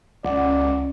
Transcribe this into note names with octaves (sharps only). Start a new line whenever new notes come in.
C#2 C#4 D5 F#5